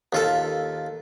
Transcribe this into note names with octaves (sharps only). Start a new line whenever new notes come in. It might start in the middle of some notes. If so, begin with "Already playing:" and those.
D#2 F4 A4